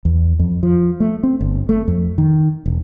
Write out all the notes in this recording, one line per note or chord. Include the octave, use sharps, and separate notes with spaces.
E2
F2
F3
A3
C4
G1
A3
F2
D#3
E1